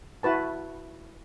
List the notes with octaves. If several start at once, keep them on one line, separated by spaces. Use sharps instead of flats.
E4 F#4 B4 A5